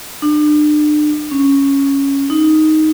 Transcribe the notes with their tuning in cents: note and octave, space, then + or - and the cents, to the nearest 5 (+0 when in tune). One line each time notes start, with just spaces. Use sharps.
D4 +35
C#4 -5
D#4 +5